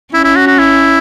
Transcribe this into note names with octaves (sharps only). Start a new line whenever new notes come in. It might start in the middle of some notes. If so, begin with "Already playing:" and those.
C#4 E4
E4
F#4
F#4
E4